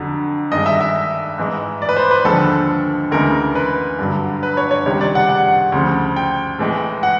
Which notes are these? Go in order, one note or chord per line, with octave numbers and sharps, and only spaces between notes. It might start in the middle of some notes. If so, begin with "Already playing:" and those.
Already playing: F2 D3 F#3
G2 D#3 G#3 D#5
E5
E5
G#2 E3 G#3
D5
B4
C5
B4
D#2 D3 F3 G#3 A4
D2 C#3 E3 G#3 A#4
B4
G2 D3 F#3
B4
C#5
C#5
C#2 C3 D#3 G3 C#5
D5
F#5
F#5
D2 C#3 F3
G5
A2 E3 G#3
F#5